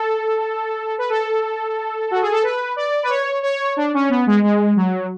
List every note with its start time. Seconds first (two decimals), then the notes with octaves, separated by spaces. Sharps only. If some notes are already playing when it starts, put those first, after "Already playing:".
Already playing: A4
0.98 B4
1.10 A4
2.11 F#4
2.22 G#4
2.32 A4
2.43 B4
2.76 D5
3.03 B4
3.09 C#5
3.43 C#5
3.76 D4
3.94 C#4
4.10 B3
4.27 G#3
4.43 G#3
4.76 F#3